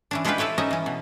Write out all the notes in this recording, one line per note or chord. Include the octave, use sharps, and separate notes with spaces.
E3 C#4 D4
G#3 D4 E4 F4 G4 B4
E4 A4 B4 C#5 G5
C#4 D#4 D#5 E5
E3 C#4
B2